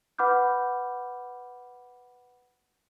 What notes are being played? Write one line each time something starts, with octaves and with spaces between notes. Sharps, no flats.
B4 F#5 B5 D6 F6 G6